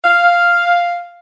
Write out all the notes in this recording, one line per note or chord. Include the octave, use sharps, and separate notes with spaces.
F5